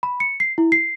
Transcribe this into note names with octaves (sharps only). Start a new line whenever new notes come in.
B5
C#7
C7
E4
C7